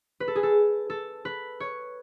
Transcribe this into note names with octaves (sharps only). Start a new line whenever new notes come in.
B4
A4
G#4
A4
A4
B4
C#5